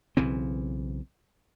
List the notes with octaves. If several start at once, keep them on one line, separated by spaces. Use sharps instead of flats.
B1 C#3 E3 C4